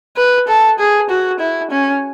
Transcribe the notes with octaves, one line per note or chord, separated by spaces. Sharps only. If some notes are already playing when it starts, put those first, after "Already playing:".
B4
A4
G#4
F#4
E4
C#4